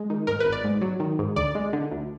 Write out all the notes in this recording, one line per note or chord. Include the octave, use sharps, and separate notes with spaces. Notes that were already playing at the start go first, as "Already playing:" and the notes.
Already playing: G#3
D#3
G#2 A#4
G#1 B4
D5
G#2
F#3
D#3
G#2
D2 D5
G#3
D3
D2